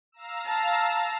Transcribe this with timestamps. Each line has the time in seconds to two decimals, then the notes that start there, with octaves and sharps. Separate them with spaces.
0.12 F5 A#5 E6
0.47 A5